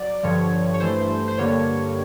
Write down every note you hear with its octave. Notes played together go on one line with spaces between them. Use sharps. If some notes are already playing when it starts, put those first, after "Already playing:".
Already playing: F#3 D5
G2 D3 F3 C#5
C#5
G2 E3 A3 C5
C5
G2 D3 G3 A#3 C#5